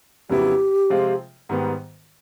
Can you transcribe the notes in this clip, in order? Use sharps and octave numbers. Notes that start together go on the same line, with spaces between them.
F2 C#3 F#3 B3 E4 G4
C3 F3 G#3 C4 F4
G#2 D#3 G3 B3